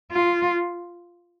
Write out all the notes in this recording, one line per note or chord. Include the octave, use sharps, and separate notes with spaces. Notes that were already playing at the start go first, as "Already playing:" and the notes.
F4